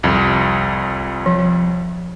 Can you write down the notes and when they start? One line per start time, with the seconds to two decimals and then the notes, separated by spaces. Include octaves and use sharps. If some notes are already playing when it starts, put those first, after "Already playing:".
0.03 C2 F2
1.26 F3